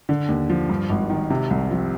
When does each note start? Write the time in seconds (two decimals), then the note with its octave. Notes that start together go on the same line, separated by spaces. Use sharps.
0.09 D3
0.29 D#2
0.50 F3
0.69 G2
0.90 G#1
1.10 D#3
1.30 C3
1.51 C2
1.71 F3